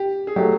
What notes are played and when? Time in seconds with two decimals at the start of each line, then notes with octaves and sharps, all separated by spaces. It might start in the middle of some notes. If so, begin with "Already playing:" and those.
Already playing: G4
0.27 G#4
0.36 F#3 A3 G4